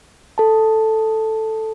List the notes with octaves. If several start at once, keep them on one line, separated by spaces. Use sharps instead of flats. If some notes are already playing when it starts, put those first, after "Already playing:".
A4 A5